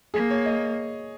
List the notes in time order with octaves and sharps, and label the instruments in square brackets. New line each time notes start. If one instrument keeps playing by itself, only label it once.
[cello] A#3 [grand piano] G#4
[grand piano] C#5
D#5